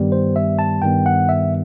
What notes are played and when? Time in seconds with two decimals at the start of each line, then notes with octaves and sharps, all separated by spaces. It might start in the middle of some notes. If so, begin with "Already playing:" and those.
Already playing: G2 D#3 G3 B3
0.12 C5
0.36 E5
0.59 A5
0.82 G2 D#3 G3 B3 G5
1.06 F#5
1.29 E5